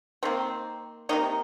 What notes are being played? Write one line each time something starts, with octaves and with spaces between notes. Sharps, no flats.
D#3 A#3 C4
C3 D#3 A#3 D#4